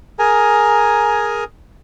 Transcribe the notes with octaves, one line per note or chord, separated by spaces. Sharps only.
G#4 A#4 G#5 A#5